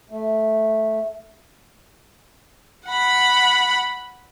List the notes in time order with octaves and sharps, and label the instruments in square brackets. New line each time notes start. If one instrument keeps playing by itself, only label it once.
[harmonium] A3
[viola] F#5 B5